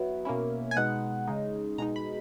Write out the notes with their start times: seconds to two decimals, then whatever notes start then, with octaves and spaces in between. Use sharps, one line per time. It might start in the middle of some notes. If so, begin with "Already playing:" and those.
Already playing: F#3 B3 E4
0.25 B2 A#3 C#4 E4
0.71 G#5
0.77 B2 G#3 B3 D#4 F#5
1.28 C#3 G#3 D#4
1.78 B2 G#3 D#4 A#5
1.96 B5